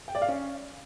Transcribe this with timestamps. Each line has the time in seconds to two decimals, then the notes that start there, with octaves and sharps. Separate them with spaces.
0.08 G5
0.15 D5
0.22 F5
0.28 C#4